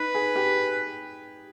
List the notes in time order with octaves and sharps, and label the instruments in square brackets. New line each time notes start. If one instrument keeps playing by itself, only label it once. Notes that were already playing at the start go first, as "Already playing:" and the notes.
Already playing: [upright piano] D#4 [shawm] B4
[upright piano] G#4
G4